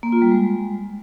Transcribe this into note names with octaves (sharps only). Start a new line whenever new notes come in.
A#3
F4
G3
G#3